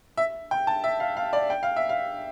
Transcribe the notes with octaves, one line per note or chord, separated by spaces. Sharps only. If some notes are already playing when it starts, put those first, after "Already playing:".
E5
G5
A5
E5
F5
F5
D5
G5
F5
E5
F5